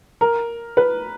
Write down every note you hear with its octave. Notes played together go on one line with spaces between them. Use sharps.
A#4
B4